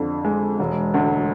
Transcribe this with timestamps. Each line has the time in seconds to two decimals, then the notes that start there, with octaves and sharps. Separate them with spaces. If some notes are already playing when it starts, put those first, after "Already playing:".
Already playing: F2 D3
0.25 G#3
0.60 E1
0.94 D2